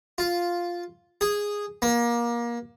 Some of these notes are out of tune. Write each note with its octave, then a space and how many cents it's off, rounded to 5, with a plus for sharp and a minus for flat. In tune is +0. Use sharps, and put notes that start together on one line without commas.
F4 +0
G#4 -10
A#3 +25